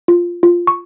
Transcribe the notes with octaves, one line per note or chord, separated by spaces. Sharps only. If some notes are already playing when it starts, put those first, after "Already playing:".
F4
F4
C#6